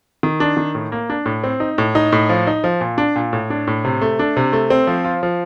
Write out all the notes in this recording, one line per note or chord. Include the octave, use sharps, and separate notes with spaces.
D#3
D4
D#3
A2
A#3
D4
A2
C4
D#4
A2
D#4
A2
F3
D#4
F3
A#2
D4
A#2
A2
D4
A2
C3
A3
D4
C3
A3
C4
F3
F4
F3